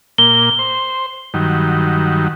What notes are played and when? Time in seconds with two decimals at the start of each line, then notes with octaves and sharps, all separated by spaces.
0.18 A#2 A#3 G7
0.59 C5
1.34 G2 D#3 F#3